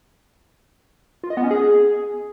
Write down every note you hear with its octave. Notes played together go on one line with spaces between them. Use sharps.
F4
D#5
B3
C#4
G#4